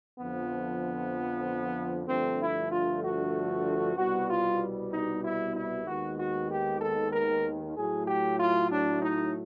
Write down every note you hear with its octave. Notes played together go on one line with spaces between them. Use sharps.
F2 D3 F3 B3
G2 D3 F3 A3 C4
E4
F4
F#4
C2 B2 G3 B3 F#4
F4
D#4
E4
E4
D#2 D#3 G#3 B3 F#4
F#4
G4
A4
A#4
A2 F#3 A3 G#4
G4
F4
D4
D#4